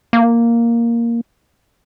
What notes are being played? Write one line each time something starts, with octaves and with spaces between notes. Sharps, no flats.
A#3